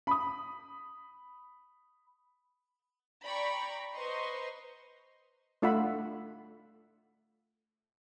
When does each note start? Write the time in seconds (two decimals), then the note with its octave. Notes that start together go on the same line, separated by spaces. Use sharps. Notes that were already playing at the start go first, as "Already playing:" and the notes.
0.07 B5 D#6
3.25 D5 G5 A#5 B5 C#6
3.96 B4 C5 D#5 A#5 C6 C#6
5.62 A3 D4 F4 E5 F#5 B5